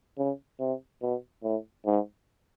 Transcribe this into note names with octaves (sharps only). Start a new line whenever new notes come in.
C#3
C3
B2
A2
G#2